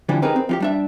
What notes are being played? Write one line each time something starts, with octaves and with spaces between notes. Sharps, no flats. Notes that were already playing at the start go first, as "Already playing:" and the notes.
D3 E3 F3 G3 D4
C4 D#4 G4 G#4 A#4 B4
C4
F3 D#4 G4
G3 D4 E5